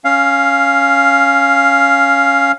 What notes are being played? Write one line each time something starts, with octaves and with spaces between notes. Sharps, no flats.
C#4 F5